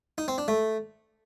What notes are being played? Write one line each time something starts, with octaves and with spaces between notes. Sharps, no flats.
D#4
C4
D4
A3